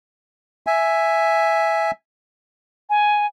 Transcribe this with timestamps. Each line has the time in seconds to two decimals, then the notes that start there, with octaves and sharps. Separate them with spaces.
0.67 E5 G#5
2.90 G#5